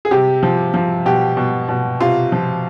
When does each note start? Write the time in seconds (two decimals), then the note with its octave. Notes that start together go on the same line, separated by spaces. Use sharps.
0.05 G#4
0.11 C3 G4
0.43 F3
0.74 F3
1.06 B2 G4
1.37 B2
1.69 B2
2.00 C3 F4
2.32 F3